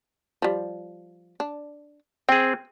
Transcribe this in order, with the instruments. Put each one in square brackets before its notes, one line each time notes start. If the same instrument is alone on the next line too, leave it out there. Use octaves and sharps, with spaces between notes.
[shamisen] F3 G3
D4
[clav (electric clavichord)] C4 G#4 [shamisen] G5